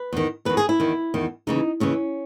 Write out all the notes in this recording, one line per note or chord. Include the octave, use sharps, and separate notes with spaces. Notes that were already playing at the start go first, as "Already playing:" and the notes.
Already playing: B4
E2 D#3
E2 D#3 B4
G#4
E4
E2 D#3
E2 D#3
D#2 C#3 E3 D#4
D#2 C#3 E3 C#4